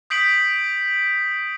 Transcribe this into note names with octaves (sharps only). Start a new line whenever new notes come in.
D#6 G6 B6 C7 D7 F#7